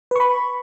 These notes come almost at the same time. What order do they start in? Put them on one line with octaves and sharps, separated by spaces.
B4 C#6 B5